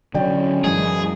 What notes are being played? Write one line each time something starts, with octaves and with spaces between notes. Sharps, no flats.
D3 F#3 C#4 D5 G5
F#2 E3 G#3 G#4